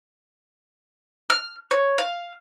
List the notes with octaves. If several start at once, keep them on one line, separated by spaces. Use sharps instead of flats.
F6
C#5
F5